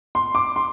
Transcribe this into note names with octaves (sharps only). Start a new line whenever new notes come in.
C6
D6
C6